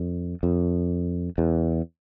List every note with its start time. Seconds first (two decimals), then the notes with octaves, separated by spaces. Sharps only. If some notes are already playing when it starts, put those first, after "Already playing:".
Already playing: F2
0.43 F2
1.38 E2